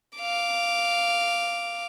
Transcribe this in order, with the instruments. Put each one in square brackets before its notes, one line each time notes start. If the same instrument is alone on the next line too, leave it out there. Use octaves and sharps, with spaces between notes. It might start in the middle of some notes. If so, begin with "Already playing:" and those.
[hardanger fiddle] F5 D6